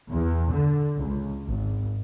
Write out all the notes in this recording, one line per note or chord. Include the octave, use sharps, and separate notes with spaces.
E2
D3
C#2
G#1